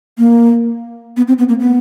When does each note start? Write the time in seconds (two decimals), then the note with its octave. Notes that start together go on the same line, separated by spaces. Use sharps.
0.18 A#3
1.17 B3
1.28 C4
1.38 B3
1.49 A#3
1.60 B3